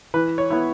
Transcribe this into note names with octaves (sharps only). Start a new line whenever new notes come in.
E3 B4
C#5
B3 E4